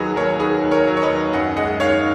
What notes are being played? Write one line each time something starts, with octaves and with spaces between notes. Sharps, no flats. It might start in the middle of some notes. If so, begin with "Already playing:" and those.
Already playing: D#2 D#3 F#3 D#4 F#4 G#4 B4
D#2 A#4 C#5
D#3 G#4 B4
D#2
A#4 C#5
F#3
C#5
B4 D#5
D#2
F#2 D#5 F#5
G#3 D#5 F#5
D#3 C#5 F5